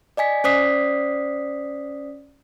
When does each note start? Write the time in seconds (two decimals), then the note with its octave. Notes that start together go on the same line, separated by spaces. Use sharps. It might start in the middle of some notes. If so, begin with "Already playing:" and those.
0.17 D5 D#5 G#5 B6
0.44 C#4 C5 D5 D#6 B6 C7